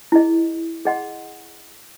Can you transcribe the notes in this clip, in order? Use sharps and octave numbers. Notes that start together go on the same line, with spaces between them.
E4 G#4 D#5
G#4 D#5 F#5 C6